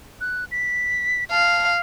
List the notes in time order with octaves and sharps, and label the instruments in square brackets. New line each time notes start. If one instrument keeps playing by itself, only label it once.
[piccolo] F#6
B6
[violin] F5 [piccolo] A5